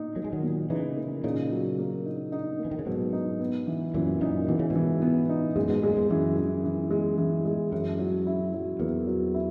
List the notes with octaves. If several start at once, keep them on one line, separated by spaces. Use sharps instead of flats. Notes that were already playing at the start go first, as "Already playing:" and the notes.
Already playing: A#2 D#4
F#3 A#3
G#3
D#3 F#3
A#2
C#3 E3 D#4
A#3
A#2 C#3 D#4
F#3
A#3
D#4
D#4
A#3
E3
D#3
C#3
G#2 B2 F#3
D#4
B3
E3
F#2 A#2 E3
F#2 A#2 D#4
B2 E3
C#3
G#2 B2
E3
B3
D#4
F#2 A#2 G#3
G#2 B2
F#2 A#2 G#3
E2 G#2
F#2 E3
E3
E3
G#3
E3
G#3
F#2 E4
F#3
E4
F#3
E2 A#3
F#3
E4